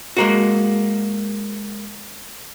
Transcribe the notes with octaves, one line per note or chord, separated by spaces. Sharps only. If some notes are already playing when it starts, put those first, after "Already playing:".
G#3 A#3 F#4